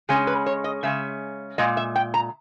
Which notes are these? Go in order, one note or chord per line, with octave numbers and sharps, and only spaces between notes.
C#3 G#3 C#4 G#4
B4
C#5
D#5
C#3 G#3 C#4 E5
A#2 G#3 D#5
E5
G5
A#5